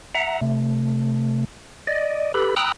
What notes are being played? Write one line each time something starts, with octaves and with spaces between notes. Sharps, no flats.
E5 F#5 A#5
C3 A3
D5 D#5
G4 A4 B4 B5
G5 A#5 B5 D#6 E6 F#6